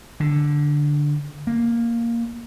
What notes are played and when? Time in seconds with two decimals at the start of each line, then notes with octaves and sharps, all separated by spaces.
0.20 D3
1.47 A#3